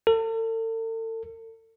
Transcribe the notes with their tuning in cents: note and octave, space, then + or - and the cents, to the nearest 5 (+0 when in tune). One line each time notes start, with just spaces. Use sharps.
A4 +40